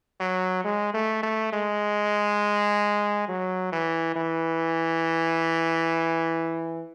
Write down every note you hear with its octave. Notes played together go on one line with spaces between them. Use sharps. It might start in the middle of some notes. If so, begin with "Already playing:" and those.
F#3
G#3
A3
A3
G#3
F#3
E3
E3